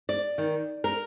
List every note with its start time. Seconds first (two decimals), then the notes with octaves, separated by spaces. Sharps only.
0.09 D5
0.38 D#3
0.84 A#4